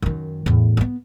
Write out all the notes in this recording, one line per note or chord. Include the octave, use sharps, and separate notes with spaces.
F#2 D#3
E2 A2
A#3 B3